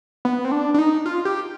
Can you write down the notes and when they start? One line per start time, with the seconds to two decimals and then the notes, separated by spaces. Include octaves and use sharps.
0.25 B3
0.45 C4
0.52 D4
0.74 D4
0.78 D#4
1.06 F4
1.25 G4